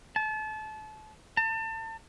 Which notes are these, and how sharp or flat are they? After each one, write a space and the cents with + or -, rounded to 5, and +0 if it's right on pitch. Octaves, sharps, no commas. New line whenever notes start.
A5 -30
A5 +30